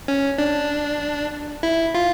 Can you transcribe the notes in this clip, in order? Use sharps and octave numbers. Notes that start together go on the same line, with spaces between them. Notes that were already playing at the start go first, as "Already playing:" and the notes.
C#4
D4
E4
F4